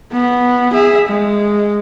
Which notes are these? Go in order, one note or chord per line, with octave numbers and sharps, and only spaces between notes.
B3
G#4 E5
G#3